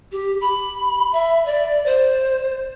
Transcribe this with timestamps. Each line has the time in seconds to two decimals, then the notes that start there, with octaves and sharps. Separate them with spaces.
0.11 G4
0.40 B5
1.12 E5
1.45 D5
1.85 C5